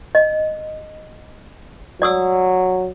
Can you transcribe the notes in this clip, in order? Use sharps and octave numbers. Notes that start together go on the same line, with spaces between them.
D#5
F#3 D5 D#6 E6